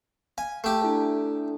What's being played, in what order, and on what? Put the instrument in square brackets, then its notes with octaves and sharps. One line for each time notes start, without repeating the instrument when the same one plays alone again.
[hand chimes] F5 [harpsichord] G#5
[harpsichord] A3 G4 [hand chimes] A5
[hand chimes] D4 E4 A4